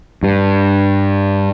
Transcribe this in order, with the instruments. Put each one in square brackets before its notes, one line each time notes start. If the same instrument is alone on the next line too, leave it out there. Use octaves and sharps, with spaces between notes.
[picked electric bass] G2